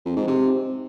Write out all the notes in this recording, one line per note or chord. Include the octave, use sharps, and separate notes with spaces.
F2
G#2
C3